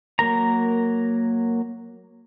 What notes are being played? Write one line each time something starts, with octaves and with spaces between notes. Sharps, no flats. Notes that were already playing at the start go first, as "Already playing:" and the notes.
F#3 A#3 A#4 A#5